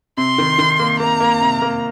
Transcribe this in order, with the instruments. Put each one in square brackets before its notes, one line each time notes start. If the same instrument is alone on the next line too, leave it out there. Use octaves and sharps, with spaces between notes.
[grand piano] C3 [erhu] C6
[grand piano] D#3
D#3
A#3
[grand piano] A#3 [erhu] A#5
[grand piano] A#3
C3
A#3